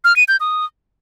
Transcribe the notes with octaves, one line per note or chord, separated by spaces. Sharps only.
F6
D#7
G6
D#6